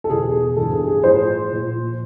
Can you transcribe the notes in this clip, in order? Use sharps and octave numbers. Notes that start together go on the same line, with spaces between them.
A4
E2 B2 G#4
G2 E3 A4
G#4
G#4
A2 F3 C5
A#2 F3